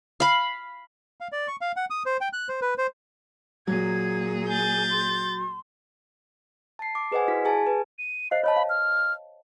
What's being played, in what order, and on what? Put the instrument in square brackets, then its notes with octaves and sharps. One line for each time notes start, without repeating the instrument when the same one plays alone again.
[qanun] F5 B5
[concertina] F5
D5
C#6
F5
F#5
D#6
C5
G5
F#6
C5
B4
C5
[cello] A#2 G#4 [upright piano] F#3 [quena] G#6
[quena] G#5 [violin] G6 A6
[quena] C6
[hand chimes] A5 C7
D6
G#4 B4 C5 D#5 F#5 G#5
E4 F#4 B6
G#4 G#5 A5
B4
[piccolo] D#7
[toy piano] C5 D#5 F5 [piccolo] C7
[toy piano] C#5 D#5 A5 [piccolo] B5
[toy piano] F5
[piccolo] F6